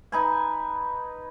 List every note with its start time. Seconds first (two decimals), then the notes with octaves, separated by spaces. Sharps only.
0.12 D#4 B4 G#5